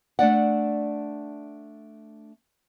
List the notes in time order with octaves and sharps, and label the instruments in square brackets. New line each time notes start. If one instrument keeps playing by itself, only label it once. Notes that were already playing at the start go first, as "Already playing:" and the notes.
[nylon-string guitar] A3 D4 D5 F#5